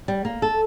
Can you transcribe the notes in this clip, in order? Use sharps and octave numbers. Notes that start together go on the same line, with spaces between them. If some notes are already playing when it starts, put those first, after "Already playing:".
G3
A#3
A4